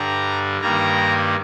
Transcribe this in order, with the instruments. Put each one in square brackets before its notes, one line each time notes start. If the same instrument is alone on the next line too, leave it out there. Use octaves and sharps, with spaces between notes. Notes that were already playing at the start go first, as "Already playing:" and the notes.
Already playing: [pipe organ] G2 D3 G3 A#5
G2 D#3 G3 A#3 A#5